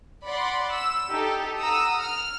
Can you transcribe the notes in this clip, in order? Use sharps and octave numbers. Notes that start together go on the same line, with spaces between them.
D5 F#5 B5 C6
E6
D#4 G4 A4
F#5 A#5 D#6 E6
F6